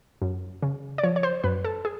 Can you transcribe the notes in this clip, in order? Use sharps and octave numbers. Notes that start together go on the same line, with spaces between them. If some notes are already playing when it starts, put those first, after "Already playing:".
F#2
C#3
D5
F3 C#5
C#5
C5
F#2 B4
A4
G#4